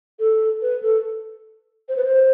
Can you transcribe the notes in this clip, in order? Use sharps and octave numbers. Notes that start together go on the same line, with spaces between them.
A4
B4
A4
C5
B4
C5